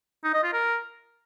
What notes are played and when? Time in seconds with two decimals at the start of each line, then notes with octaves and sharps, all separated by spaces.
0.24 D#4
0.34 D#5
0.43 F4
0.53 A#4